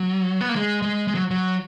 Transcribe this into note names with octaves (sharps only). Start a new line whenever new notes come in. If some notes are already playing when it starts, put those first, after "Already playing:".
Already playing: F#3
B3
A#3
G#3
G#3
G#3
F#3
F#3